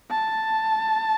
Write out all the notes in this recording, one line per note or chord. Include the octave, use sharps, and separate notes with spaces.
A5